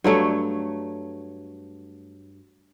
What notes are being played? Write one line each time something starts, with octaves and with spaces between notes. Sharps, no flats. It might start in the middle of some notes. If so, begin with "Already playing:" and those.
G2 F#3 A3 C#5